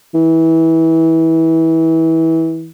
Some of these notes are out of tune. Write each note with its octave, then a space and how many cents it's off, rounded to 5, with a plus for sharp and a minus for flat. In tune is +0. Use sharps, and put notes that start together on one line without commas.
E3 -25